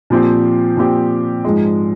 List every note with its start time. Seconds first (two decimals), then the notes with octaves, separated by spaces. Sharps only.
0.10 A#2 F3 C4 G4
0.77 A#2 F3 C4 G4
1.44 G#2 F3 G#3